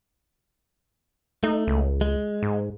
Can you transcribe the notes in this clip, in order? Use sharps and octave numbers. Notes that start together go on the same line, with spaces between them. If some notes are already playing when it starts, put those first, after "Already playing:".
A3 D#4
C#2
G#3
G#2